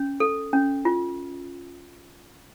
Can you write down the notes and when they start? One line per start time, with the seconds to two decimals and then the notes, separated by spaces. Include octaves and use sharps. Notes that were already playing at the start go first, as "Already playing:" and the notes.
Already playing: C#4
0.20 A4
0.53 C#4
0.85 F4